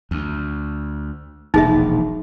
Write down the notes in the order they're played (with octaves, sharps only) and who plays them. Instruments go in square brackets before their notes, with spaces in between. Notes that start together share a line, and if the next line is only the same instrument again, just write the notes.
[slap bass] D2
[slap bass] E1 A#1 [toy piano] D#4 G#4 E5